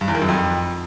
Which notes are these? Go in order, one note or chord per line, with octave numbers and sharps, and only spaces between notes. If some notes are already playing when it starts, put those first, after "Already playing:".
G2
E2
D#3
F#2
F2